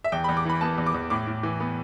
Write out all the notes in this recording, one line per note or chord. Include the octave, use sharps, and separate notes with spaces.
E5
E2 G5
E2 B5
D6
E3 B5
B3 A5
E2
D6
E2
A2 D6
A2
E3
B3